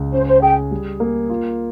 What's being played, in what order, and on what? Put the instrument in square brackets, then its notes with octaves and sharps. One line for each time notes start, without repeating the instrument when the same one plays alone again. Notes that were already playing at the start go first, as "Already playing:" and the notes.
Already playing: [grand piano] C#2
[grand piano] C#4 [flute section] C5
[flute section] C5
[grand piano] G#4 [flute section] G5
[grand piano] G3
A#3
F4